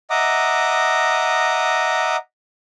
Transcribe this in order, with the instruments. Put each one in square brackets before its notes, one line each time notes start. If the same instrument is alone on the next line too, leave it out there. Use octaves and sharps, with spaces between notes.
[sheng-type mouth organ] D#5 E5 F#5 A#5 D6 D#6